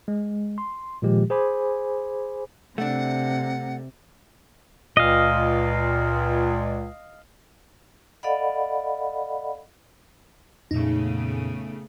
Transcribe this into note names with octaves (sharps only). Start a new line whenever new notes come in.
G#3
C6
A#2 D#3 F3 G#3 G4
G#4 C5 G#5 B5 D6
C3 A3 D4 F#5
C#2 A#2 D#5 F5
A4 D5 D#5 F5 F#5 B5
F2 A#2 C#3 A3 B3 D#4